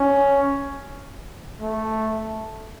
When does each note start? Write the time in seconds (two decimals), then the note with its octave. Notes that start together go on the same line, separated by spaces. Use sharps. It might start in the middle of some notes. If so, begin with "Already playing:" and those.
Already playing: C#4
1.61 A3